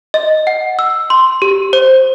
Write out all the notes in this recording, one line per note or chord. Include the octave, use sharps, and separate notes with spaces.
D#5
F#5
E6
C6
G4
C5